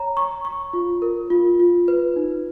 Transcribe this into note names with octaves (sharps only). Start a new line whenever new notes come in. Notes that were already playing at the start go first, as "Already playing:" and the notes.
Already playing: C#5 A#5
C#6
C#6
F4
A#4
F4
F4
B4
D#4